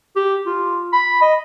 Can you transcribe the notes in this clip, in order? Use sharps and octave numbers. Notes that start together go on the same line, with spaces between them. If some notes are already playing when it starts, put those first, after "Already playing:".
G4
F4
B5
D#5